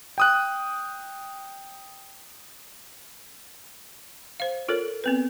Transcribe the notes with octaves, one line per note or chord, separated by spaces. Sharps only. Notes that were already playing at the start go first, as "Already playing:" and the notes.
G5 D#6 F#6
C5 F5
F4 A4 A#4 C#5
B3 C4 B4